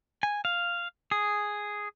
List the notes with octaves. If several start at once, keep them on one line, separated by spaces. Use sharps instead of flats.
G#5
F5
G#4